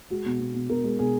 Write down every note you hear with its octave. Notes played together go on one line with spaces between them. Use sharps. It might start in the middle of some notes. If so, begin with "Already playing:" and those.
G#3 F#4
B2
B2
B2
B2 A#4
G#3
B2 G#4